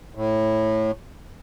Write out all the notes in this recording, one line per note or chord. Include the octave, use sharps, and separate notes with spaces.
A2